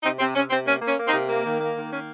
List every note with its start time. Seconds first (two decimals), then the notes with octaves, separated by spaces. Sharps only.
0.03 C3 C4 D#4
0.19 C3 C4
0.35 C3 C#4
0.50 C3 C4
0.66 A#3 C#4
0.82 A#3
0.87 C#4
0.98 A#3
1.07 C4 D#4
1.13 C3
1.29 A#3
1.44 D#3
1.60 A#3
1.75 D#3
1.91 A#3 C#4